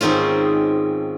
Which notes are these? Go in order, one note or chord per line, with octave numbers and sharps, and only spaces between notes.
G#2 D#3 C4 C#4 F4